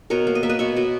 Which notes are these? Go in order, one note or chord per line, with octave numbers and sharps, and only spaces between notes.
B2 A#4 C#5
A#3
D#5
A#3 E5
B4 D#5
B2 C#5 E5
B2